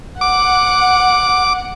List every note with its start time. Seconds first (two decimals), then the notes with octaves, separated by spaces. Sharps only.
0.21 F#5 D6